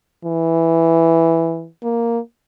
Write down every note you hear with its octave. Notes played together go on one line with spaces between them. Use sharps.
E3
A#3